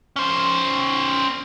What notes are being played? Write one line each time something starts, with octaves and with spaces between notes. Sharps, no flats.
C#4 C5